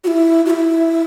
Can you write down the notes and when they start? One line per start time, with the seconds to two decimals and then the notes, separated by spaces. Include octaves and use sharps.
0.04 F#4
0.07 E4
0.46 F#4
0.50 E4